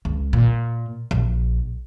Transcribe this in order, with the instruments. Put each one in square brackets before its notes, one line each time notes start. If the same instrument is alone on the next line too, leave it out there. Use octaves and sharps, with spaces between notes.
[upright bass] C#2
A#2
A#1